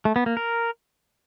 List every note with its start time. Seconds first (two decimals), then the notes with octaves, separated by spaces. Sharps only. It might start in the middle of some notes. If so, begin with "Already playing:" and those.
0.05 A3
0.16 B3
0.26 A#3
0.37 A#4